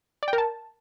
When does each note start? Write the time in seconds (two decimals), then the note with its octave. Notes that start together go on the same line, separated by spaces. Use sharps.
0.23 D5
0.28 G5
0.33 A#4
0.38 A5